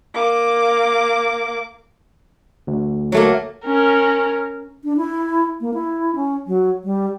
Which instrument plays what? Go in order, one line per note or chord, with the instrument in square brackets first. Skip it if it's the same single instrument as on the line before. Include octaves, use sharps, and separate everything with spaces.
[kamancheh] A#3 D6
[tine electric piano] D2
[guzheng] F#3 A3 A#3
[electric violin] C#4 A#4
[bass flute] D4
E4
A#3
E4
C#4
F#3
G3